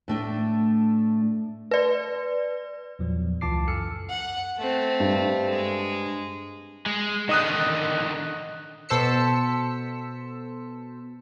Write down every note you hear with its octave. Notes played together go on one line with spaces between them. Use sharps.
A2 A3 D4
B4 D5
E2 A#2 F3 F#3
C#2 E3 F4 A5 D6 C7
F#2 A4 G#5 E6 F6 C#7
F#5
A3 C4
G2
G#3
G#3
D3 D#3 D#5 D#6 F#6
B2 A4 C5 E6 B6 C#7